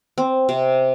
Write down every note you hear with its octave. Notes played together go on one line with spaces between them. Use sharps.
C4
C3